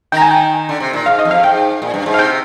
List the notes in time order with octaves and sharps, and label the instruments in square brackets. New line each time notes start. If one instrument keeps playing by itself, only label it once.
[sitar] D#3 [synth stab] G5 A#5
[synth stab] G#5
G5
[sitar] D3
C3
A#2
[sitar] G#2 [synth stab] F5
[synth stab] D#5
[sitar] F2
[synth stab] F5
[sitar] G#2 [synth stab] G5
[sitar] A#2
G2
G#2
[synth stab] F5
[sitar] C3 [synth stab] G5